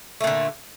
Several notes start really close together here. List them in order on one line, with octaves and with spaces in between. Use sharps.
A3 A#2 D3